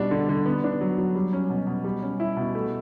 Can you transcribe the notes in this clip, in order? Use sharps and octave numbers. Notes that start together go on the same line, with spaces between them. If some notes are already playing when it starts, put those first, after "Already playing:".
Already playing: B2 G3 D4
D3
D3
B3
D4
F#3
F#3
G3
C#4
B2
B2
G3
C#4
E4
B2
A3